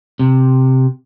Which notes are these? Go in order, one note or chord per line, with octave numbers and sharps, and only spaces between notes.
C3